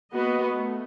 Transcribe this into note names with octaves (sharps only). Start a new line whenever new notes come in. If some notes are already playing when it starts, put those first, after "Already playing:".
A#3 B3 F#4 B4 D#5
A3